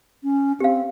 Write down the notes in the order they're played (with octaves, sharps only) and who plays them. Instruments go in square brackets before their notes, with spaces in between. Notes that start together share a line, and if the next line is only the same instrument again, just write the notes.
[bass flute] C#4
[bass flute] C4 [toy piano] G4 F5